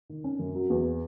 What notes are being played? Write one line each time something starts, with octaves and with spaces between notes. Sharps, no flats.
D#3
C#4
F#2
F#3
E2